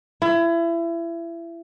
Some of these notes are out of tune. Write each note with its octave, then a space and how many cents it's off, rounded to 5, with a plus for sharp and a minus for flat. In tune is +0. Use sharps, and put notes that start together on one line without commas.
E4 +30